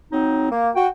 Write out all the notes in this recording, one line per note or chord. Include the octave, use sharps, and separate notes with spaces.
F#3 C4 D#4
A#3
F#4 G5